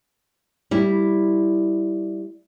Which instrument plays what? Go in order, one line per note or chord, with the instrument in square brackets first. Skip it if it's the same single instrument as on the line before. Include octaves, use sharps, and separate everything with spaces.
[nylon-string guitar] G3 E4